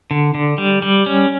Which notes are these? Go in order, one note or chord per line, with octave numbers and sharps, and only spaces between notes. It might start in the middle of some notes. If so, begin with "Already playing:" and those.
D3
D3
G3
G3
C#4